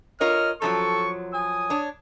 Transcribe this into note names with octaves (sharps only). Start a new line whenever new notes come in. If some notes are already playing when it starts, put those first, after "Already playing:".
F4 A#4 C#5 D#5 F6
F#2 F3 F#3 A4 C#6
G#5 D#6
D4 C#5